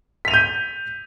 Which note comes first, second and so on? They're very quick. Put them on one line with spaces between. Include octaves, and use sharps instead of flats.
B6 F7 D#7 G6